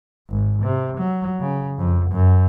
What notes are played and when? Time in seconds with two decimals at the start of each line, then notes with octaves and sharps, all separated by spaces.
0.30 G#1
0.63 C3
0.98 F#3
1.41 C#3
1.78 F2
2.11 F#2